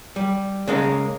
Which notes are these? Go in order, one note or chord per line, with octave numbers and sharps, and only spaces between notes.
G3
C#3 G#3 A#3